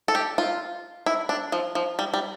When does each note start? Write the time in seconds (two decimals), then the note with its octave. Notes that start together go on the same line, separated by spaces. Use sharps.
0.08 A4
0.15 G4
0.38 F4
1.06 E4
1.29 D4
1.52 F3
1.75 F3
1.99 G3
2.14 G3